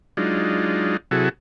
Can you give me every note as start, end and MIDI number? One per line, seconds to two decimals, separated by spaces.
0.17 0.97 54
0.17 0.97 56
0.17 0.97 62
0.17 0.97 63
0.17 0.97 65
1.11 1.29 48
1.11 1.29 54
1.11 1.29 64
1.11 1.29 66
1.11 1.29 68
1.11 1.29 69